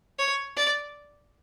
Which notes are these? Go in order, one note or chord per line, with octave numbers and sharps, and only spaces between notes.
C#5
D5